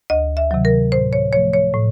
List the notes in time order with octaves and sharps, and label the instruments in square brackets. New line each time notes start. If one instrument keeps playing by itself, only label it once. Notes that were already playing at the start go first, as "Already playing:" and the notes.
[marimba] D2 D#5
E5
C3 D#3 F#3
A#4
A2 C5
C#5
F3 A3 C#5
C#5
A2